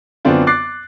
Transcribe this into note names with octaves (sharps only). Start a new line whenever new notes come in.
F#2 D3 B3 C4 D4 F4
D6 F#6 A6 C7